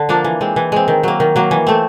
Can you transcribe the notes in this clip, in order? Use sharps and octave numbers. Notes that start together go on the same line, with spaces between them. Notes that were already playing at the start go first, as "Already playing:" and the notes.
Already playing: D3
F3 A#3 D4
E3
G#3 C4
E3
G#3 C4
D#3
F#3 A#3
D#3
F#3 A#3
E3
A3 C4